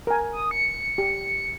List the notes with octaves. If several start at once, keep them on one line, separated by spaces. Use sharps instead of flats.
A#4 G#5
D#6
C#7
G4